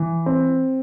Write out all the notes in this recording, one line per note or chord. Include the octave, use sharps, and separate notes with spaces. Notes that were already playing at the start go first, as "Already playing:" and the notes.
Already playing: E3
C4